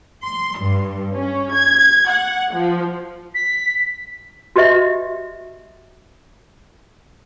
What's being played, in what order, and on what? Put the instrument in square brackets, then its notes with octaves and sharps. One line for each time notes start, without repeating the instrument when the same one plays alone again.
[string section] C6
G2
C#4
G#6
F#5
F3
[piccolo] B6
[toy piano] F#4 G4 B4 D#5 E5